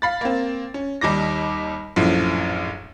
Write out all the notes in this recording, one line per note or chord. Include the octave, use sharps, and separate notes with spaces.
F5 B5 A6
A#3 C4
C#4
D#2 G3 D#4 D6 A#6
A#1 F#2 A2 F3